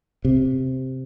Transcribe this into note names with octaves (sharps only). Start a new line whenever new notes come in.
C3